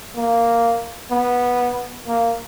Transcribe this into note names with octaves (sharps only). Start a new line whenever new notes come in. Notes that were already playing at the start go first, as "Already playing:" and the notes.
A#3
B3
A#3